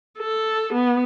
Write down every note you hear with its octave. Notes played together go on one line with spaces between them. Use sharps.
A4
B3